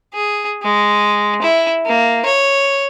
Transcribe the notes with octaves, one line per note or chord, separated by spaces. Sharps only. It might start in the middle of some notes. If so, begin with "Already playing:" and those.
G#4
G#3
E4
A#3
C#5